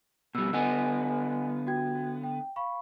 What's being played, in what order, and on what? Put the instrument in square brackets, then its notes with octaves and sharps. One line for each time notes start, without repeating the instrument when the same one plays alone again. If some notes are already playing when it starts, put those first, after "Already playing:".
[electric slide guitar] B2 G3 [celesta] E6
[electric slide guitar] D3 B3 [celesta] D#5 F#5 G#5
[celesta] F#4 G5 G#6
G5
F5 B5 C#6